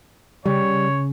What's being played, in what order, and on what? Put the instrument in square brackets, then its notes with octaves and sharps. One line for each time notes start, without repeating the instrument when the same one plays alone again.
[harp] C#3 [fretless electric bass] G3 [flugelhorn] C#5